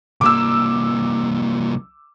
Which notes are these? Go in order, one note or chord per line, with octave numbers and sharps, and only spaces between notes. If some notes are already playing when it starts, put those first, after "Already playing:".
C2 A#3 D6 E6